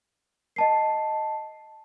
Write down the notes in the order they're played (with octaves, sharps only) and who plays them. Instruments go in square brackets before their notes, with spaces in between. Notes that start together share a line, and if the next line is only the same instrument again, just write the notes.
[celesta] D#5 A5 C7